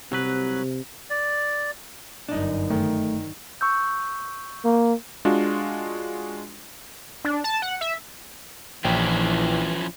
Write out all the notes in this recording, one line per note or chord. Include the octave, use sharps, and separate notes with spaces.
C2 C3 F#3 B4
D5
G1 F#2 D4 D#4
D#3 A3
C#6 E6 G6
A#3
G#3 D4 F4 F#4
D4
A5
F#5
E5
A#1 E3 F3 C#4 E4 G5